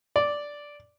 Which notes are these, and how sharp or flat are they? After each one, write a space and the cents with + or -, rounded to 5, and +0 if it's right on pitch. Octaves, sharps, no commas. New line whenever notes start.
D5 -5